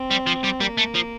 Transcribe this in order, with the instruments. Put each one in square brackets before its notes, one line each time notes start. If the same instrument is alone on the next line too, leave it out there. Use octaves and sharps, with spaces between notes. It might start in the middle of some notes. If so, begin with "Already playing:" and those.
Already playing: [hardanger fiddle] C4
[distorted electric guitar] G3
F3
G3
[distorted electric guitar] G3 [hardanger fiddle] A#3
[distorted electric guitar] A3
F3